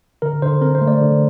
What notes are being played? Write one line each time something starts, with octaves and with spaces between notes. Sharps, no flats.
D3 A#4
D3 C5
C4 A#4
C5
A3
D5
D3